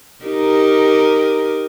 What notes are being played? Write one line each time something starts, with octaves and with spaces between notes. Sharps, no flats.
D#4 G4 A#4